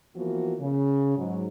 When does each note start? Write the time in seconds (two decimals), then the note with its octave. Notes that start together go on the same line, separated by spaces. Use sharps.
0.16 E3 F3 A#3 B3 F#4
0.60 C#3
1.17 G#2 F#3